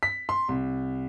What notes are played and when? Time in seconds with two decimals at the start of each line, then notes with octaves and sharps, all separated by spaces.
0.03 B6
0.29 C6
0.49 C2